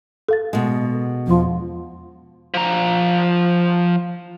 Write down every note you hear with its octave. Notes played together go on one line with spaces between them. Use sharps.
A4 F5 A6
B2 G#3
E2 F3 C6
F3 A#5